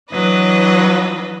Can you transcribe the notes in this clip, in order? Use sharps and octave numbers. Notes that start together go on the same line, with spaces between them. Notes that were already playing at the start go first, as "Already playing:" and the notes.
E3 F#3 D4 B4 D#5